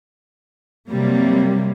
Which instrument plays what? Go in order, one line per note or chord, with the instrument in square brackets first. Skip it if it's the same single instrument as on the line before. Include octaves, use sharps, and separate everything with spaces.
[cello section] C3 F#3 G3 A#3